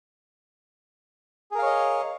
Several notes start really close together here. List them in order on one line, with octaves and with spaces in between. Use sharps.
G#4 A#4 F5 C#5 D#5